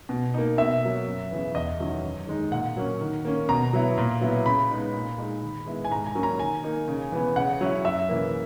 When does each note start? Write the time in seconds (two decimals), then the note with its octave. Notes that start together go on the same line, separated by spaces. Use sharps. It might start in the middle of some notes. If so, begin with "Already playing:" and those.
0.09 B2
0.34 A#3 D#4
0.58 B2 E5
0.82 F#3 A#3
1.06 F#2
1.31 C#3 E3 B3
1.55 E2 D#5
1.79 D#3 F#3 C#4 E4
2.04 F#2
2.27 D#3 G#3 D#4
2.52 A#2 F#5
2.77 F#3 A#3 C#4
3.01 D#3
3.25 A#3 C#4
3.49 B2 A#5
3.73 F#3 B3 E4
3.98 A#2
4.21 F#3 B3 E4
4.46 C#3 B5
4.70 G#3 B3 D#4
4.94 A#2
5.18 G#3 D#4
5.42 D#3
5.66 G#3 B3 E4
5.85 G#5
5.91 G#2 A#5
6.07 G#5
6.15 F#3 A#3 C#4
6.23 A#5
6.39 D#3 G#5
6.63 A#3 D#4
6.88 C#3
7.12 E3 B3
7.36 C#3 F#5
7.61 F#3 C#4 E4
7.85 F#2 E5
8.09 C#3 E3 A#3